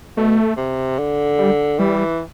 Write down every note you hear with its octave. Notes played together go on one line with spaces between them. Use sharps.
B2 A3
C3
D3
G3
E3 G3